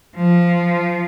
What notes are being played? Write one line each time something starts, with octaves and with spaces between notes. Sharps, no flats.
F3